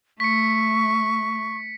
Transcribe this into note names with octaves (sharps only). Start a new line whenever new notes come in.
A3 C#6 B6 C#7